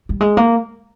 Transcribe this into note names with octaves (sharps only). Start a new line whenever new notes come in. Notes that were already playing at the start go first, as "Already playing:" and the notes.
G3
G#3
A#3